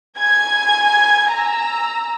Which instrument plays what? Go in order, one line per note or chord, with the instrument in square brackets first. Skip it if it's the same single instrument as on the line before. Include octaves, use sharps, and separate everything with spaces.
[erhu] G#5 [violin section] G#6
[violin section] A#5 E6